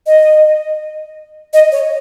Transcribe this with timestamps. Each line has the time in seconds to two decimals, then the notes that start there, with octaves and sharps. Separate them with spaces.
0.06 D#5
1.53 D#5
1.72 C#5